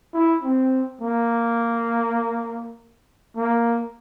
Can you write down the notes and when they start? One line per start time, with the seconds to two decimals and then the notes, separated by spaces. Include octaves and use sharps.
0.14 E4
0.42 C4
1.01 A#3
3.36 A#3